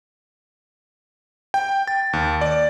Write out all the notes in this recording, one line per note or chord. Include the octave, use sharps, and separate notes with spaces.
G5
A6
D#2
D5